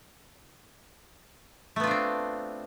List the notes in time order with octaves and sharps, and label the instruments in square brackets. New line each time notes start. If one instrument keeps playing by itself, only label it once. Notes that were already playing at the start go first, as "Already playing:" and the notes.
[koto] A3
B3
F4
D4
C4